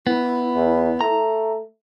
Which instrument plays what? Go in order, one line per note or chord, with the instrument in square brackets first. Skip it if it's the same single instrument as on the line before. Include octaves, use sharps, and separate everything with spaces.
[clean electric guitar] B3 [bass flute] E4
[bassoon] E2
[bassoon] A3 [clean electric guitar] A#5